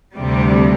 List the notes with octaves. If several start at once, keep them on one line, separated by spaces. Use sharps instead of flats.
D2 C3 G3